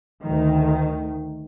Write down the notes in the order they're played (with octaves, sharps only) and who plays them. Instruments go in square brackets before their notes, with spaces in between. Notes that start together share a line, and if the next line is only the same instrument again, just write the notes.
[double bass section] D2 D#3